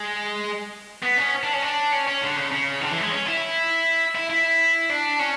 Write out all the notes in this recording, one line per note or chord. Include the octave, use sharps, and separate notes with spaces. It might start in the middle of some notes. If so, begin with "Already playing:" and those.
Already playing: G#3
B3
C#4
D4
C#4
D4
C#4
C#4
D3
C#3
C#3
D3
E3
G#3
C#4
E4
E4
E4
D4
C#4